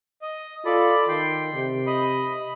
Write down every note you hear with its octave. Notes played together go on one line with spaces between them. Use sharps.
D#5
F4 A4 D5 B5
D#3 G5 C6
C3
D#5 B5